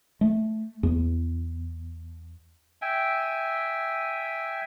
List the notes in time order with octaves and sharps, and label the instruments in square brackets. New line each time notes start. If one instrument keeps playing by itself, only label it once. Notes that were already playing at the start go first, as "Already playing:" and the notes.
[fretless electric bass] A3
E2
[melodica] E5 G5 G#5